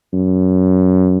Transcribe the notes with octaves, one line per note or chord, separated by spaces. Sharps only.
F#2